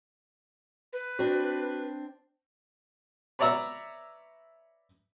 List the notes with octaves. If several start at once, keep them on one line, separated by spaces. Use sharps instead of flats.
B4
C4 D4 F#4
B4 C#5 D5 E5 A#5 E6